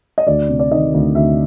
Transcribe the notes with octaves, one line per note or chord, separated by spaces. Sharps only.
D#5
D2 D5
C3
D5
D#3 D#5
D2
D2 E5